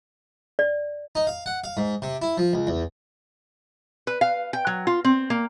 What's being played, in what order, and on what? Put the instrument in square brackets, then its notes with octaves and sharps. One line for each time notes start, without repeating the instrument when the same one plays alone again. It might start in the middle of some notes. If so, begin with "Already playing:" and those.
[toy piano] D5
[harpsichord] D#4
F5
F#5
F5
G#2
C3
E4
F3
C#2
E2
[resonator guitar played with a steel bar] B4
F5
G5
F#3
F4
C4
A#3